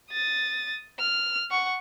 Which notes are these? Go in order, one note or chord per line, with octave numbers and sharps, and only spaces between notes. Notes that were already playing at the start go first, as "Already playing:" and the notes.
D#6 A6
F6
F#5 C#6